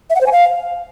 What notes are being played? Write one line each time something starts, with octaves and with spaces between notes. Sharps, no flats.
E5
F#5
C5
G#5
F5